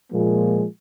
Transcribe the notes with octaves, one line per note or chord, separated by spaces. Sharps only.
A#2 F3 G#3 A#3